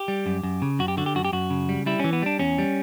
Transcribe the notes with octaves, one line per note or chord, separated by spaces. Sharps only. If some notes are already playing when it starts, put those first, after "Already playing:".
Already playing: G4
G3
F#2
F#2
C#3
F#2 F#4
G4
D3 F#4
G4
F#2 F#4
G4
F#2 F#4
C#3
G3
G3 E4
E3 C#4
B3
G3 D4
E2 C#4
G3